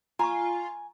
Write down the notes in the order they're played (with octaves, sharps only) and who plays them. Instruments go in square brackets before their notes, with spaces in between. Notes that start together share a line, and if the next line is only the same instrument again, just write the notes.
[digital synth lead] F4 [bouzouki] G#5 [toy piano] A#5 B5 C#6